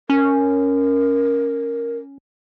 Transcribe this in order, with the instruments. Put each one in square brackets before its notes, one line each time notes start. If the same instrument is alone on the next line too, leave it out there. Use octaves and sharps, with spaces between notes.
[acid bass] C#4 [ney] A#4